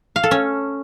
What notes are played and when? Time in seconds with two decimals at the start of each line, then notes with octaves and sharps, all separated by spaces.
0.16 F5
0.23 A4
0.31 C#4